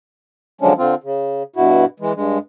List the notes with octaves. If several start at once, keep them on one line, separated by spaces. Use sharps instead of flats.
D3 F3 F#3 G#3 C#4 D4
D3 C4 F4
C#3
G2 B2 E4 F#4
E3 G#3
G2 G#3